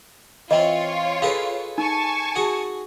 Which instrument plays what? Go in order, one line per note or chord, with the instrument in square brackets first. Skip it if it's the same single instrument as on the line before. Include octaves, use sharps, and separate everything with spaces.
[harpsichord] E3 C4 [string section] F4 C#5 [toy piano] D#5
[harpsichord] G#4 A4 B4 [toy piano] F5
[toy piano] D#4 [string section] G#5 A5 C#6
[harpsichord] F#4 G#4